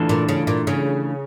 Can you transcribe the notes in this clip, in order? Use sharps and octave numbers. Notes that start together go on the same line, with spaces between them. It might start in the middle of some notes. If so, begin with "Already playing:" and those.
Already playing: E3 A3 D4 F4 A4
A#2
C#3
A#2
C#3